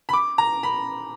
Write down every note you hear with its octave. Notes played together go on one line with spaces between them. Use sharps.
B5
D6
A#5
B5